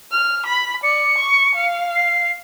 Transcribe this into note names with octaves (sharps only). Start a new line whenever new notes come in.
F6
B5
D5 C#7
C#6
F5
C7